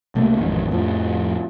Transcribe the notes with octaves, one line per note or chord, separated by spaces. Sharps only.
C#2 C3 A3 A#3
A1 F2 G#2 D#3
F2 A2 F3